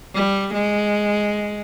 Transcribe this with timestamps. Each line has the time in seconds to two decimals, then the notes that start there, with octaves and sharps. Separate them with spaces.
0.15 G3
0.54 G#3